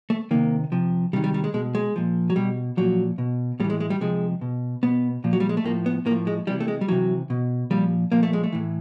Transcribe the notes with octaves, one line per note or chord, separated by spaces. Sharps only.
A3
C3 D#3 A#3
C3 F3
C3 D#3 G3
G3
G3
G#3
B2 G#3
G#3
A#2 F3
F#3
B2 G3
A#2 F3 F#3
B2
A2 E3 G3
G#3
G#3
G3
C3 F3 G#3
B2
B2 B3
A#2 F3
F#3
G3
G#3
A3
A2 F3 A#3
B3
A2 A#3
F3
G#3
C3 E3 G3
A3
G#3
G3
C3 E3 F#3
B2
A#2 F3 G3
A#2 F3 A#3
A3
G#3
A3
A2 E3